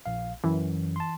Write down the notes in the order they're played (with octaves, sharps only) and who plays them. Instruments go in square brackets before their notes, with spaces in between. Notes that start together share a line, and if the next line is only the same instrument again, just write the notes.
[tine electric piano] A#1 F5
[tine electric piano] F#2 [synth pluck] E3
[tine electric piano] A5 C6